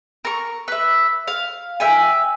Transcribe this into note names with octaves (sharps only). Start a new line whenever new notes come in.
A#4 C#6
B4 E5
F5
A#4 E5 G5 G#5